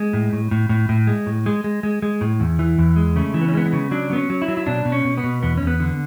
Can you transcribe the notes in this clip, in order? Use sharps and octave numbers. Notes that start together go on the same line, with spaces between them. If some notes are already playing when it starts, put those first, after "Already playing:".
Already playing: G#3
A2
A2
A2
A2
A2
G#3
A2
G#3
G#3
G#3
G#3
A2
E2
E3
E2
G#3
C#3 A3
E3
B3
C#4
G#3 B3
B3
C#3
F#3 D4
F#3 B3
C#4
F#3
E4
F#3
E4
B2 D4
B2
C#4
B2
B3
B2
E2 B3
C#4
E2
B3
D3